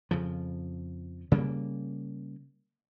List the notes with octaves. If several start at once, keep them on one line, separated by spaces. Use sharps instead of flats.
F2 C#3 F3
C#3 G3 A3 A#3